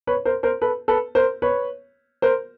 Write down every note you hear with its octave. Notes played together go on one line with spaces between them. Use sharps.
B4 C#5
A#4 C5
A#4 C5
A4 B4
A4 B4
A#4 C5
B4 C#5
A#4 C5